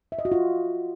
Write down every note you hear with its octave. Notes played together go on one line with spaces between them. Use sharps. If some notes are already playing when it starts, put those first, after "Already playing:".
E5
D#5
F#4
F4